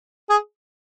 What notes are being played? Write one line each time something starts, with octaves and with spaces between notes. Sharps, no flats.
G#4